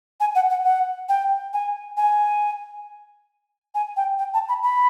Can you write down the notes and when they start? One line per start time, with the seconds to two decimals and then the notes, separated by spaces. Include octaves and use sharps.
0.20 G#5
0.35 F#5
0.50 F#5
0.64 F#5
1.09 G5
1.53 G#5
1.97 G#5
3.75 G#5
3.97 G5
4.19 G5
4.34 A5
4.49 B5
4.63 B5